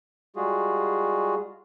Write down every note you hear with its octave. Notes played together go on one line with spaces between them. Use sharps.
G3 G#3 F4 F#4 G#4